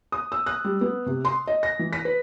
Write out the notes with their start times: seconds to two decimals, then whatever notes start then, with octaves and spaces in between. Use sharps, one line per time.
0.12 D#6
0.32 E6
0.46 F#6
0.64 G3
0.81 B3
1.06 C3
1.25 C6
1.47 D#5
1.63 A#6
1.79 E3
1.93 B6
2.05 B4